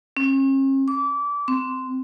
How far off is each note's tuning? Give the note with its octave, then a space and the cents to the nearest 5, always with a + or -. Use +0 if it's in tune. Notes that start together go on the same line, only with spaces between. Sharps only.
C#4 -45
D6 -25
C4 -10